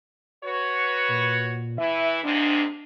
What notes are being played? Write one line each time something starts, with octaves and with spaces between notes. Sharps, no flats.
F#4 B4 C#5
A#2
E3 E4 E5
D#2 G#2 C3 D4